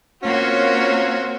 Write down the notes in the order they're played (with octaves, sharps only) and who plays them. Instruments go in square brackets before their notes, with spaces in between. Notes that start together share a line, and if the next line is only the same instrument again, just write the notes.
[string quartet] A#3 C#5 [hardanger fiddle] C4 F#4 [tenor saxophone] C#4 [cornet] F4